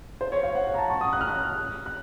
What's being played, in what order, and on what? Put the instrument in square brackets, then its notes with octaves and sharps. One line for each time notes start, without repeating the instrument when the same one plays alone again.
[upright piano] C5
C#5
F5
F#5
F#5
A#5
A5
C#6
D#6
F#6
F6
F#6
F#6